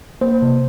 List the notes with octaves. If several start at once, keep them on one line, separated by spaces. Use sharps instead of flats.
A#3 C5
C3